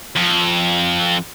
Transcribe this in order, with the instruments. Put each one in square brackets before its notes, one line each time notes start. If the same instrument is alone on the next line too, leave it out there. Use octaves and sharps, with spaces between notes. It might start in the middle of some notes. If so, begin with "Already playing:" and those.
[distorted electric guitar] F2